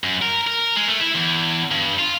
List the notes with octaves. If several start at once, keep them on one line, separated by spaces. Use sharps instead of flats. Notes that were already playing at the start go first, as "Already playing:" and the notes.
F#2
A#4
A#4
G#3
A3
E4
E2
G2
F4